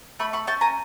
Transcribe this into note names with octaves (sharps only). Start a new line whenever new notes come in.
A3 B5 C#6
B5 C#6
C#4 G5 A5
G#5 A#5